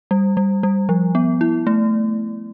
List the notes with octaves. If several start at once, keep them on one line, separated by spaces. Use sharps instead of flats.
G3
G3
G3
F3
B3
E4
A3